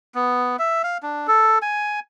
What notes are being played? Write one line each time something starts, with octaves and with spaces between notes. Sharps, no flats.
B3
E5
F5
D4
A4
G#5